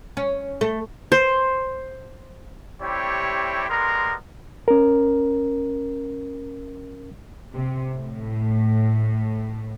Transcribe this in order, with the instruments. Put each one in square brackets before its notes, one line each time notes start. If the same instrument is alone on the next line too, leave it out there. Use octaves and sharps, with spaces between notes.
[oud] C#4
A3
[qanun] C5
[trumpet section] G3 A3 C4 E4 G4 C#5
G3 G#3 B3 A#4 A#5 C6
[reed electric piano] C#4 A#4
[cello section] C3
A2